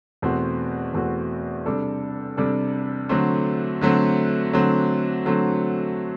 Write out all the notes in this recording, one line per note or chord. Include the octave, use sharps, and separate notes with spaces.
E2 B2 A3 C4 F#4
E2 B2 A3 C4 F#4
C3 G3 D4 A4
C3 G3 D4 A4
D3 F#3 A3 C4
D3 F#3 A3 C4
D3 F#3 A3 C4
D3 F#3 A3 C4